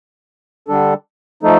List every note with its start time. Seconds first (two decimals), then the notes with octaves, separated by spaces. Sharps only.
0.68 D3 G3 D4 A4
1.43 F3 A3 D#4 A4